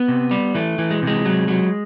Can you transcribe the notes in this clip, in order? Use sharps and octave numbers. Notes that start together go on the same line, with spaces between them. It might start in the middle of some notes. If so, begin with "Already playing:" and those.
Already playing: B3
C3
G3
E3 A3
E3
G#3
C3 G#3
F#3
F#3